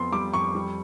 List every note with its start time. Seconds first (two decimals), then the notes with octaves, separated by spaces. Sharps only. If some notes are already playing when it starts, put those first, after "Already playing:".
Already playing: F2 B3 C6
0.12 G3 D6
0.34 F2 C#6
0.55 G3